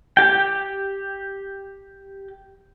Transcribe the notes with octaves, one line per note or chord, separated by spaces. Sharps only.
G4 G5